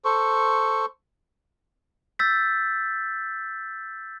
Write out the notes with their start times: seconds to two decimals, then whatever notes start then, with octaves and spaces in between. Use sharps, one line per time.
0.05 A4 C5 C#6
2.19 E6 G6 A6 B6